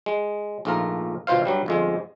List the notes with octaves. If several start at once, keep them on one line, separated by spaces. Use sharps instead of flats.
G#3
A#1 G#2 A3 F4 A#4
G1 B2 F4 C5 F5
G2 F#3 G3
G1 F2 G#3